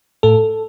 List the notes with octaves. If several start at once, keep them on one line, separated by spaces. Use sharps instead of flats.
A2 A4